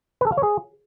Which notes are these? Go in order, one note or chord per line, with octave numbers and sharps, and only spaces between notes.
B4
A4
F5
C#5
G#4